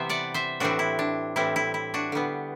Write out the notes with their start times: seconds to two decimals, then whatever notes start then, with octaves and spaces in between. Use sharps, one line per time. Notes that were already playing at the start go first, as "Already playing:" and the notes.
Already playing: C3 E3 G3 B3 C5 E5
0.09 D5 F#5
0.34 C5 E5
0.60 A2 E3 G3 C4 D4 F#4
0.79 E4
0.99 D4
1.36 A2 E3 G3 C4 E4
1.56 E4
1.74 E4
1.94 D4 F#4
2.12 D3 G3 B3